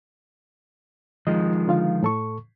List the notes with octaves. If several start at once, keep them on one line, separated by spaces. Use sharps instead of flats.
D#3 F3 G#3 D#5
D3 F4 F5
A2 A4 C#6